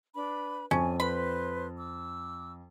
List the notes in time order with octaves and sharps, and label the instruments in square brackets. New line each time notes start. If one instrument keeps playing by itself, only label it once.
[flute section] D4 B4 B5
[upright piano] F2 [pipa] C#4 [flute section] G#5
[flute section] B4 C5 C6 [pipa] B5
[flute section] D6 E6